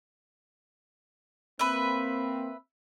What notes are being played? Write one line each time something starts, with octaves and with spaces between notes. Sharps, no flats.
A#3 C4 B4 E5